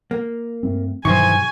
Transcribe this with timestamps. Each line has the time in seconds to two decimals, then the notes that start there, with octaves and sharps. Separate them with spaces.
0.11 A#3
0.63 G2 A3 C4
1.05 G2 B2 D#3 E3 F#3 C5 G#5 C#6